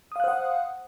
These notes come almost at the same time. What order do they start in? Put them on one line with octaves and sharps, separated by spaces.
D#6 F5 F#6 C5 F#5